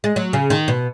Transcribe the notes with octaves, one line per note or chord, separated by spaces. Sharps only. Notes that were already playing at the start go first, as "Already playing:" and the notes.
G#3
F#3
C#3
D#3
B2